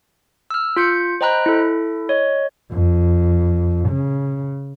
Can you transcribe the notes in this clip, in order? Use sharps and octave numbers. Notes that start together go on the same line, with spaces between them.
E6 F6
F4 G6 C#7
C5 D#5 G5 A#5 B5 F#6
E4 A4
C#5 D#5
F2
C#3